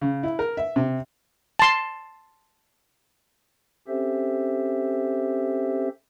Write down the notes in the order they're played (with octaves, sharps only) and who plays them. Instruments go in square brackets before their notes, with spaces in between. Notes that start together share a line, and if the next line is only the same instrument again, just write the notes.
[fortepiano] C#3
E4
A#4
E5
C3
[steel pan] A5 C6
[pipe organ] C4 C#4 G4 A4 C5 E5